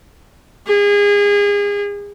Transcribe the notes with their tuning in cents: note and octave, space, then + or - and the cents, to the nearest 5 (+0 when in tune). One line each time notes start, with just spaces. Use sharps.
G#4 -30